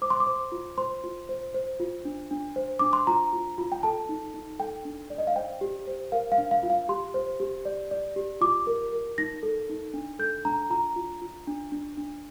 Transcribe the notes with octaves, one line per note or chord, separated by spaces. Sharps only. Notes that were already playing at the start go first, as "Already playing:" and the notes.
C5 D6
C6
D6
C5
F4
C5 C6
F4
C5
C5
F4
D4
D4
C5
D4 D6
C6
F4 A#5
F4
F4
G5
A4 A5
D#4
D#4
A4 G5
D4
D5
D#5
F5
C5 G5
G4
C5
A#4 F5
F5
D4
F5
F4
F5
G4 C6
C5
G4
D5
D5
G4
F4 D6
A#4
A#4
D#4 A#6
A4
D#4
D4
A4 G6
D4 A#5
F4 A#5
F4
F4
D4
D4
D4